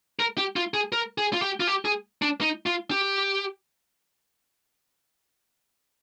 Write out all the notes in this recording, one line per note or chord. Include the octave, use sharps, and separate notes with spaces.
A#4
G4
F4
G#4
A#4
G#4
F4
G4
F4
G4
G#4
D4
D#4
F4
G4